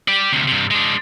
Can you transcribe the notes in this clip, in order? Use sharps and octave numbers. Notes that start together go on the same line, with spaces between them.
G4 D5
D2 C3
G2 C3
G#3 D4